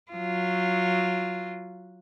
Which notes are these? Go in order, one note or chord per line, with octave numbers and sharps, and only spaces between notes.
F#3 F4